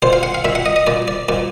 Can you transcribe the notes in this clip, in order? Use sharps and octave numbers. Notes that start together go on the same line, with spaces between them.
A#2 C5
F5
F#5
F5
A#2 E5
F#5
D#5
D#5
A#2 D5
D5
A#2 D5